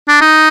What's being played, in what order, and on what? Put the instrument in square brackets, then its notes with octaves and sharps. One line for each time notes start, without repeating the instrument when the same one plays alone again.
[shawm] D4
D#4